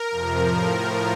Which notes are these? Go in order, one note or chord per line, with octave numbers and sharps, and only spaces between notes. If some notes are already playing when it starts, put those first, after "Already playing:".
Already playing: A#4
F2 C3 F3
A2 F3 A#4
A2 F3